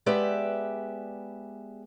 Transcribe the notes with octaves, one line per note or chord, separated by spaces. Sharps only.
G#3 B3 G4 B4 D5 E5